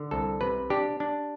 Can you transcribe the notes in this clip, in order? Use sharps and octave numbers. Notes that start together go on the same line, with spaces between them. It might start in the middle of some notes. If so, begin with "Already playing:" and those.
Already playing: D3
C2 A4
C3 B4
D4 G4
D4